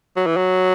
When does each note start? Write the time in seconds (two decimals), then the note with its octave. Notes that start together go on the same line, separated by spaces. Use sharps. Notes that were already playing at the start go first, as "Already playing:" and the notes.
0.16 F#3
0.26 E3
0.36 F#3